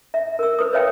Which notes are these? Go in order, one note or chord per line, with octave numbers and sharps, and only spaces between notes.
E5
A#4 E6
B4 D#6
B4 C#5 E5 F5 G5